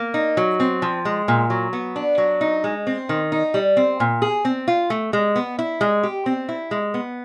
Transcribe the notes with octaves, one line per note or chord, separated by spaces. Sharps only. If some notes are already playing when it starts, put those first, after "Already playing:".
Already playing: A#3
D#4
F#3
C4
F3
G#3
A#2
F#3
B3
D4
F#3
D#4
G#3
C4
D#3
D#4
G3
C4
A#2
G#4
C4
F4
A3
G#3
B3
E4
G#3
G4
C4
E4
G#3
B3